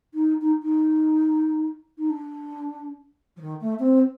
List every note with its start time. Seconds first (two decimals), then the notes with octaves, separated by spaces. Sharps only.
0.14 D#4
0.41 D#4
0.62 D#4
1.98 D#4
2.10 D4
3.36 F3
3.41 D#3
3.60 A3
3.79 C4